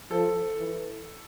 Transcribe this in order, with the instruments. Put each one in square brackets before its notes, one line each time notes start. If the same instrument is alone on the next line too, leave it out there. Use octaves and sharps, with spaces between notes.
[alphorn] F3 [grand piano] A4
[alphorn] E3